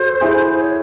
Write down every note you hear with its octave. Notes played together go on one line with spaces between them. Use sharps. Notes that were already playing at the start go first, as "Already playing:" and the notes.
Already playing: F#4 A4 C5
E4 G#4
C#5